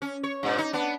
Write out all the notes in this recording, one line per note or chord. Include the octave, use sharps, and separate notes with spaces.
C#4
C#5
G2 A#2
D#4
B3 D4